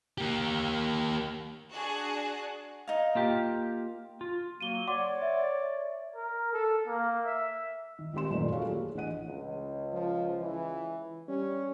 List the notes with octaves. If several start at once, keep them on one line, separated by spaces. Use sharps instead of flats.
A#3 G4
D4 F#4 G#4 A5 F#6
D#4 F5
A#3 F4 G4
F4
F#3 A#3 F#4 D#7 G7
C#5 D5 F#5 C6 D6
E5
A#4
A4
A#3
E5
D#3
G#1 D#3 C4 G4 C6 E7
F#2 A#2 D#3 A3 B4 D5
F4 F#4 G#4 A4 C#5 F5
A#3 G4 G#4
A1 E3 D4 D#5 F#5 D#7
C#2
F3
E3
G3 C#4